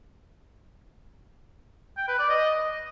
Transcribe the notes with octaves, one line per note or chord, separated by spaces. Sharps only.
G5
B4
D5
D#5